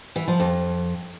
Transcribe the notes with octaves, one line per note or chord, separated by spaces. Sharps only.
E3
F3
F2